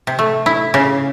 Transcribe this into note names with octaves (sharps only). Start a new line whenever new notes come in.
C3
A3
E4
C#3